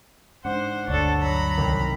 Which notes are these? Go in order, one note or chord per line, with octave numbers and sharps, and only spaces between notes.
G#2 D4 C5 F#5
G1 D2 D4 A4 C#5
F#3 A#5 B5
C2 C3 D#3